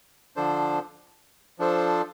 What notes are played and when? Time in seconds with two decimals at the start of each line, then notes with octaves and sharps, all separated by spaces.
0.36 D3 F3 D4 A4 C5
1.59 F3 D4 A4 C5